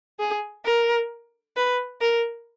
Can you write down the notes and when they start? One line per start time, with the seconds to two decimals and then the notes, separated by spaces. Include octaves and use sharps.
0.19 G#4
0.65 A#4
1.56 B4
2.01 A#4